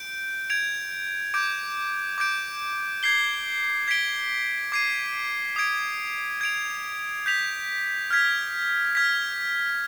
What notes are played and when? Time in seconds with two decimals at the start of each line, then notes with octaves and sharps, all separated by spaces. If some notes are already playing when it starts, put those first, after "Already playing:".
Already playing: G6 D7
0.50 G#6 D7 F7
1.34 D6 G6 D7
2.18 D6 G6 D7
3.03 G#6 C7 G7
3.88 G#6 B6 D7 G7
4.72 D6 G#6 C7 D#7
5.56 D#6 G#6 D7
6.41 G#6 D7 F7
7.26 G6 B6 F7
8.11 F6 G#6 B6
8.95 F6 G#6 B6